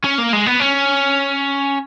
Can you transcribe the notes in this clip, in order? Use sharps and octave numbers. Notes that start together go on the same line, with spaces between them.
C#4
A#3
G#3
B3
C#4